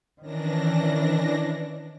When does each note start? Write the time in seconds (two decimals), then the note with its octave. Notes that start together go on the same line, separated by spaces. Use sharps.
0.21 D#3 E3 C#4 D4 A#6